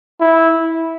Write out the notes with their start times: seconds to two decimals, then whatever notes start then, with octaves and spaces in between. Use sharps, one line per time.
0.20 E4